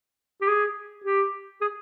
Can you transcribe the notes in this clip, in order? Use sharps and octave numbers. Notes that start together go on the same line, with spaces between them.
G4
G#4
G4
G#4